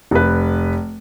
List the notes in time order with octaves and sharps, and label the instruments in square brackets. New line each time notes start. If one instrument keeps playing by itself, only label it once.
[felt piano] F1 B4